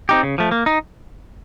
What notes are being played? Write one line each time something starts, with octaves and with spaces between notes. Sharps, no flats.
C4 D#4 G4
C#3
F3 A3
A#3
D#4